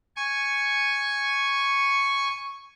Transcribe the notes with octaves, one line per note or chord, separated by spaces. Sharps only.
G#5 C#6